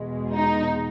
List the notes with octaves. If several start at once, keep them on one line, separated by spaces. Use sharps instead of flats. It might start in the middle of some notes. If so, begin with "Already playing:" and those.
Already playing: E2 B2 G#3
D#4